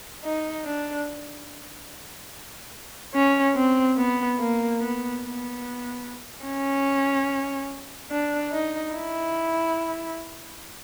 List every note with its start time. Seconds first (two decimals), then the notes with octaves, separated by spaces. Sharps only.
0.24 D#4
0.65 D4
3.14 C#4
3.55 C4
3.97 B3
4.39 A#3
4.80 B3
5.21 B3
6.45 C#4
8.11 D4
8.52 D#4
8.94 E4